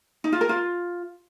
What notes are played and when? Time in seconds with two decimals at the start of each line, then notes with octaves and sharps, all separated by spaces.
0.24 D#4
0.33 F4
0.41 A#4
0.49 F4